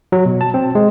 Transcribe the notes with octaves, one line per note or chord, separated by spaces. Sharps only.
F#3
B2
A5
C4
G#3